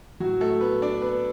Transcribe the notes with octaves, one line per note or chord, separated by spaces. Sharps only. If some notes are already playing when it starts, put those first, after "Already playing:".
A2 F#3 F#4
A3 A4
B3 B4
D4 D5
B3 B4